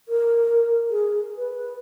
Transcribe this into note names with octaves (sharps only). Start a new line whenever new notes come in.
A#4
G#4
B4